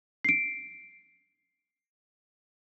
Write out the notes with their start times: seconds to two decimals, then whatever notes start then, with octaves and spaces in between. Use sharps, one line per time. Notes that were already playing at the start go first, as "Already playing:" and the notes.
0.25 C7 D7